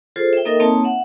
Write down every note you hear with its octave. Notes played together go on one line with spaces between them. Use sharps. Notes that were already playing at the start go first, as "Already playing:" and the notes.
F4 G#4 A4 C5
E5 G5
A#3 D#4 A4 A#4 D#5 E5
A#3 C4 D#4 C#5 A5
E5 F#5